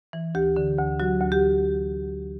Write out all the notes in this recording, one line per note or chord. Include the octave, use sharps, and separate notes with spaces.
E3
D2 G4
D3
D2
F#3 F#4
D2
G4